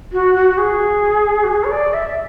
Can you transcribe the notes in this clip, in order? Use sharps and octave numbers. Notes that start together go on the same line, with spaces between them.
F#4
F#4
F#4
G#4
F#4
G#4
C#5
D5
E5